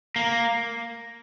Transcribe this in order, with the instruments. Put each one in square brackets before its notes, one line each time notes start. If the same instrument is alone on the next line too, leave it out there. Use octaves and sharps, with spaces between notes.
[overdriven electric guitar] A#3